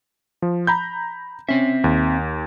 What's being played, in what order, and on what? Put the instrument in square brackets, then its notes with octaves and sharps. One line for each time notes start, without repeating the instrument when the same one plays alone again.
[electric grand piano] F3
A#5 B5 G6
[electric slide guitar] C4 E5 [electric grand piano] C#4
[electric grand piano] D#2